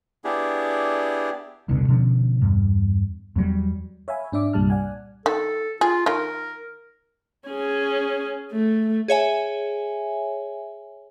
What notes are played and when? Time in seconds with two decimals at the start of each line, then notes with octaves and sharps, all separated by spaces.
0.24 B3 D4 E4 G4 G#4
1.69 E1 C2 B2 D3
1.88 B2 D3 F3 C#4
2.42 E2 G2
3.36 E2 F#3 G3
4.08 C#5 E5 F5 G#5 B5
4.32 G#2 D4 D5 E5 D6
4.53 C2 G2 A#2 G3 A5 F6
4.70 D5 F#5 G#5
5.26 D#3 A4
5.81 F4 G#4
6.06 D#3 F4 A#4
7.47 C#4 G#4
8.52 A3
9.08 G#4 C#5 E5 G#5